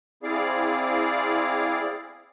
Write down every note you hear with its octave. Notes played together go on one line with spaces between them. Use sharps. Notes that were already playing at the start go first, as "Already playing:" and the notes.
C4 E4 G#4 D5 F5